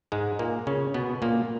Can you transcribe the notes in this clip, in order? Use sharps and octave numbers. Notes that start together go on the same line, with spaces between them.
G#2 G#3
A#2 A#3
C#3 C#4
B2 B3
A#2 A#3